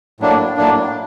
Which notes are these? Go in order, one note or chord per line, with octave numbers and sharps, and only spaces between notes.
A2 F#3 A#3 D4
A2 F#3 A#3 D4